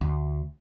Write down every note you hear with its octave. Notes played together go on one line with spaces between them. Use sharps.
D2